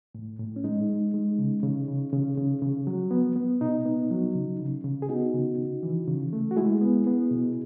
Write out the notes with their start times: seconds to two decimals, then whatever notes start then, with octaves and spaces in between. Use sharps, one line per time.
0.15 A2
0.39 A2
0.56 C#4
0.64 G#3 D#4
0.89 G#3
1.14 G#3
1.38 C#3
1.63 C#3
1.88 C#3
2.12 C#3
2.38 C#3
2.62 C#3
2.87 F#3
3.11 B3
3.36 B3
3.61 B2 D#4
3.86 B3
4.11 F#3
4.35 C#3
4.59 C#3
4.84 C#3
5.02 G#4
5.09 B3 D#4 F#4
5.34 C#3
5.58 C#3
5.83 E3
6.07 C#3
6.33 A3
6.51 F#4
6.56 G#3 E4 G#4
6.81 B3
7.07 B3
7.31 B2